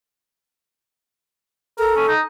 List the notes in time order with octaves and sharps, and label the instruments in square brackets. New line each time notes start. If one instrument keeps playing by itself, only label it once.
[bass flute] A4 [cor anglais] A#4
[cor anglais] C#4
D#4